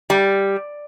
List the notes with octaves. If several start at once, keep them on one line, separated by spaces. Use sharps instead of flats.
G3